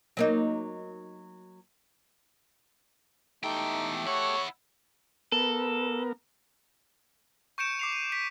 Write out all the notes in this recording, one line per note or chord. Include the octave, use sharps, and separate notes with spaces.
F#3 A#3 D#4
E2 A3 D#4 G4 A4 G5
E4 C#5 F#5
B3 A4 A#4
C#6 G6 C#7 D7 E7
D6 C7 F7
D#7
D6 B6 D7